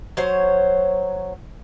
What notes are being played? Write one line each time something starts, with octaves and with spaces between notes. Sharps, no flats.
F#3 C5 C#5